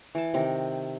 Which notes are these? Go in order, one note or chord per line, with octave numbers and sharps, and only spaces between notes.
E3 A5
C3 D#3